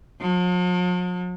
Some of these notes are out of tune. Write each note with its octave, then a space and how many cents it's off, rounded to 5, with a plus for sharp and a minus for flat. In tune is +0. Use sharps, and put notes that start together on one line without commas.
F3 +45